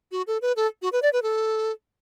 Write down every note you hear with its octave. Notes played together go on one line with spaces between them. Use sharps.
F#4
A4
B4
A4
F#4
B4
D5
B4
A4